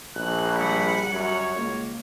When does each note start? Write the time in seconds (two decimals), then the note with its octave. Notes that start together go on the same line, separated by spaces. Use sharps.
0.16 A#1 F#6
0.57 G3 F#5 B5
1.11 F#2 C#5
1.56 C#2 A#3